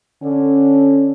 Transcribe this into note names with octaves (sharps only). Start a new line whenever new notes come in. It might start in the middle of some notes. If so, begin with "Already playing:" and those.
D3 C#4